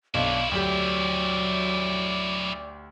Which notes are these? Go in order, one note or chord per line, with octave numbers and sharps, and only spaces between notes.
B1 C#4 D4 E4 F5
D2 F#3 G4 D5